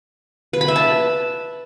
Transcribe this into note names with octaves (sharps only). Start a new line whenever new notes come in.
B4
B5
E5
A5